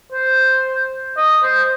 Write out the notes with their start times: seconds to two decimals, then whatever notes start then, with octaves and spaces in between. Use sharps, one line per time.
0.12 C5
1.17 D#5
1.43 C5